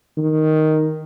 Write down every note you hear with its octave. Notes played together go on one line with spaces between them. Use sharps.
D#3